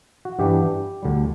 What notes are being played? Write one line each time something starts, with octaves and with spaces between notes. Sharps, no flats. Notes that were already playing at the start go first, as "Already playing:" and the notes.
F#4
G2 E3 G3 B3 D4 G4
D2 D3 G3